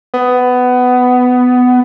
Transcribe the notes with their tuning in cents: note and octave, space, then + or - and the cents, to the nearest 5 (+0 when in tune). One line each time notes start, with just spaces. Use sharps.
B3 +15